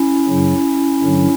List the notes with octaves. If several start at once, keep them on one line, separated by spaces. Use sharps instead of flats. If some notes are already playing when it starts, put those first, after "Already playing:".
Already playing: C#4 E4
F#2 C#3 F#3
G2 D3 F#3